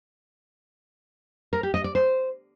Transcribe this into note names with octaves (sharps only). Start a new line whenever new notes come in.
A#4
G4
D#5
D5
C5